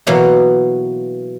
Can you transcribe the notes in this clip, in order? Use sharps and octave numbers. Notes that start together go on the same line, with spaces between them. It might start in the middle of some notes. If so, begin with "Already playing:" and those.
B2 E3 F#3 A#3 E4 F#4